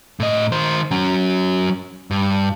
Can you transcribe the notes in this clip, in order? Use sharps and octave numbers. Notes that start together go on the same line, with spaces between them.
A2 D#5
D#3 C5
F#3 C#4
G2